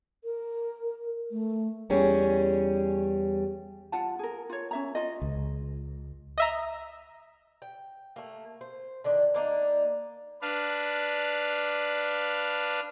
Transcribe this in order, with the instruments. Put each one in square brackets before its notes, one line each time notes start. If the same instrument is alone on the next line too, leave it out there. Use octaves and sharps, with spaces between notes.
[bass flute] A#4
A3
[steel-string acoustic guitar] E2 G3 C#4 G#4
[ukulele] F4 F#5 A5
G#4 A#4
F4 C#5
C#4 E5 A#5
F4 D#5
[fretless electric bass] C#2
[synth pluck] D#5 E5 A#5
[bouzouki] G5
A3 A#3
C5
D3 D#3 D4
A#3 D4 D#4
[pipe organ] D4 B4 F5